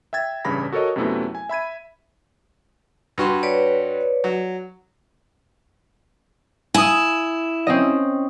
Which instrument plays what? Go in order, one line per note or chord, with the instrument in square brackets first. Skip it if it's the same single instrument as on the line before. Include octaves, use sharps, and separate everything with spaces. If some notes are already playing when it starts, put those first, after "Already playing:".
[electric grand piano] E5 G5 G#6 A6
A1 G2 C#3 B5 A#6
F#4 A4 A#4 C#5 D#5
F#2 C3 F#3 A3 B3 E4
G#5
E5 B5 G#6 D#7
[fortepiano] G2 F#4 C6
[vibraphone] B4 C#5 D5
[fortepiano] F#3
[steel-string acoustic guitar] E4 [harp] G#5 D#6
[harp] C4 C#4 D#5